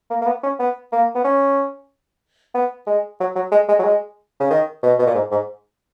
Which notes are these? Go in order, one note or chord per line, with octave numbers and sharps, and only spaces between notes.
A#3
A#3
B3
C#4
B3
A#3
B3
C#4
B3
G#3
F#3
F#3
G#3
G#3
F#3
G#3
C#3
D#3
B2
B2
A#2
G#2
G#2